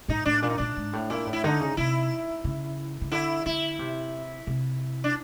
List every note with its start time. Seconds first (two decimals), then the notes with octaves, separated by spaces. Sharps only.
0.08 A2 D#4
0.25 A2 D4
0.42 A#2 D4
0.50 D#4
0.58 A#2 D4
0.77 G#2
0.93 A2
1.10 A#2 E4
1.26 A2
1.33 E4
1.44 D3 D#4
1.61 C#3
1.77 C3 E4
2.44 C#3
3.01 C#3
3.12 D3 E4
3.46 D3 E4
3.79 C3
4.47 C3
5.04 D4